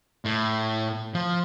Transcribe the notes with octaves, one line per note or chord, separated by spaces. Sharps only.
A2
F3